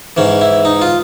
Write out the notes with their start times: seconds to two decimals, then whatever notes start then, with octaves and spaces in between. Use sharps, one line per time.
0.17 G#2 E3 C#4
0.41 E4
0.65 D#4
0.82 F4